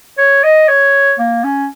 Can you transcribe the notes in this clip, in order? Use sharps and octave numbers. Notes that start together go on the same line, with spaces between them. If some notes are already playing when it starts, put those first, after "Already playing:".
C#5
D#5
C#5
A#3
C#4